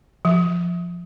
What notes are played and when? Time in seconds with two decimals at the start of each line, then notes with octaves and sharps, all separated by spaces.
0.25 F3